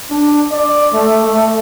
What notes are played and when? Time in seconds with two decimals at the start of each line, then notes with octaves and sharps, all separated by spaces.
0.11 D4
0.52 D5
0.93 A3
1.25 A3